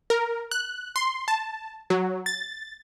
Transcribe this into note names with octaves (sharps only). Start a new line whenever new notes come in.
A#4
F#6
C6
A5
F#3
A6